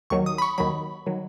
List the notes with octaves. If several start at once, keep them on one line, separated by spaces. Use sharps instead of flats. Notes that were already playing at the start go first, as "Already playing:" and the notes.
D#2 D#3 F#3 C#6
D#6
B5
C#6
D#2 D#3 F#3 B5
D#3 F#3